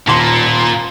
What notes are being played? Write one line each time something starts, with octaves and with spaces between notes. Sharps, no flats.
D#1 A#2 A#3 C6